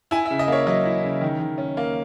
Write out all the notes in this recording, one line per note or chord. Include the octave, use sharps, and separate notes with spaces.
E4 G#5
E5
C#3
D#5
A#3 C#5
F#3 D#5
E4
C#3
D#3
D#3
C#4
A#3